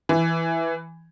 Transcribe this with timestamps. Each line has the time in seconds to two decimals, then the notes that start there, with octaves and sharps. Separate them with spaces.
0.09 E3